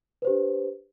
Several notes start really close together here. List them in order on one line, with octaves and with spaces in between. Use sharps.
B4 C5 G4 D4